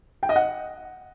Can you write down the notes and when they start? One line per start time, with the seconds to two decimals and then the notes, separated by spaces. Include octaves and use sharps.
0.23 G5
0.29 D#5
0.36 F#5